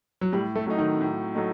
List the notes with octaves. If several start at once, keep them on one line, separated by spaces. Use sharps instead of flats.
F#3
A2 G3
A3
F#3 A3 D#4
D#3
A2
F#3 A3 D#4